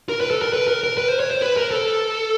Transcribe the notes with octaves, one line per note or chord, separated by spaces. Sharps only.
A#4
B4
A4
A#4
B4
A#4
A#4
B4
C5
C#5
C5
B4
A#4
A4